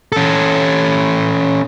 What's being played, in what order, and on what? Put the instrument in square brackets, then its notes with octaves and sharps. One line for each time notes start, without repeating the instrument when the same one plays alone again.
[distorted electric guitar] C#4 A4